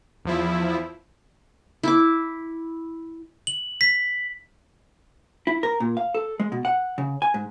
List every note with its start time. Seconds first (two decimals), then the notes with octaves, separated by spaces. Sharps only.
0.25 E2 F3 E4
1.83 E4 D6
3.47 F#7
3.81 B6
5.47 E4
5.63 A#4
5.80 A#2
5.97 F5
6.15 A4
6.40 G#3
6.52 B2
6.65 F#5
6.98 C#3
7.22 G#5
7.34 G#2